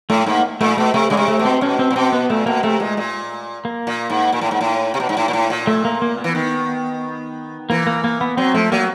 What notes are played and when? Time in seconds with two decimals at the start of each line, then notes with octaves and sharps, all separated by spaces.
0.10 A2 A3
0.26 G#2 A#3
0.61 A#2 A3
0.77 B2 A3
0.94 C3 A3
1.10 C#3 G#3
1.17 C3
1.28 A3
1.39 B2
1.45 C4
1.61 B2 C#4
1.79 C4
1.91 A#2
1.96 B2 C4
2.12 B3
2.30 A#2 A3
2.46 B2 A#3
2.63 C3 A3
2.80 A#2 G#3
2.97 A#2
3.65 A#3
3.87 A#2
4.10 G#2
4.32 A#2
4.41 A2
4.51 G#2
4.61 A2
4.94 C3
5.00 B2
5.09 G#2
5.17 A2
5.28 A#2
5.33 A2
5.50 A#2
5.67 A3
5.85 A#3
6.02 A#3
6.18 B3
6.24 E3
6.35 D#3
7.70 E3 A#3
7.87 A#3
8.04 A#3
8.21 B3
8.37 F#3 C4
8.54 F3 A3
8.72 F#3 A#3